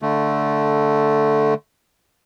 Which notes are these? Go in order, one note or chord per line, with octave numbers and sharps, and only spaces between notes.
D3 A3